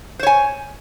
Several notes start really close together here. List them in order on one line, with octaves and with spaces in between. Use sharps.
C5 C#5 G#5